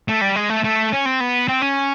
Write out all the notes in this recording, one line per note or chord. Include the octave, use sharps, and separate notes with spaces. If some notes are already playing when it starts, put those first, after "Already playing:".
A3
G3
G#3
A3
A3
C#4
C4
B3
C4
C#4